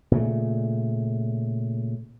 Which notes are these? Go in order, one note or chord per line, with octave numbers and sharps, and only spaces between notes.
A#2 C#3 A3